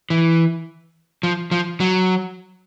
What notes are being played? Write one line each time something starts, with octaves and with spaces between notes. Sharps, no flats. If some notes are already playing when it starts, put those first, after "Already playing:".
E3
F3
F3
F#3